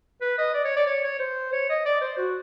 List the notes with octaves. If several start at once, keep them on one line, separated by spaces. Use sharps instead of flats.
B4
D#5
D5
C#5
D5
C#5
C#5
C5
C#5
D#5
D5
C5
F#4